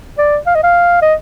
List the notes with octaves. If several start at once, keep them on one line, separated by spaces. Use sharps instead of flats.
D5
F5
D#5
F5
D#5